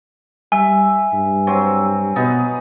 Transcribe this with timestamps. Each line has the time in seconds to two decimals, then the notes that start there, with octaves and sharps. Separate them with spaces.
0.52 G3 E5 G#5
1.13 G2
1.47 F#3 C4
2.16 B2 B3 D#4